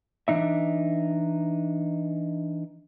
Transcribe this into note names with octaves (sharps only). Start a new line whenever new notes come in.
E3 D4 D#4 E5